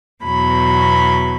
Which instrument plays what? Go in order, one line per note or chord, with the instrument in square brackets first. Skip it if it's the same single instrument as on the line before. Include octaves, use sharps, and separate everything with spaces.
[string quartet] E2 B2 F#3 B5